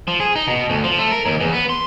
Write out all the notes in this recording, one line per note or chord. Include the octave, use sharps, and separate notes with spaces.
F3
G#4
D#4
B2
D2
F3
A3
A#4
D#2
E2
B3
C6